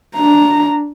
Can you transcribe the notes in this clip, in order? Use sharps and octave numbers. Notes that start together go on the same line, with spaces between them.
D4 A#5